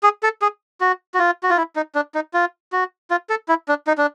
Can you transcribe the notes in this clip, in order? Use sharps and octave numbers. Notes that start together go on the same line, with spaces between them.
G#4
A4
G#4
F#4
F#4
F4
F#4
F4
E4
D#4
D4
D#4
F4
F#4
F4
A4
E4
D4
D#4
D4